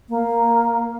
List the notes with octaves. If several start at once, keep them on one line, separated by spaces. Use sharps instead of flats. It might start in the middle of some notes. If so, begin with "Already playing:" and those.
A#3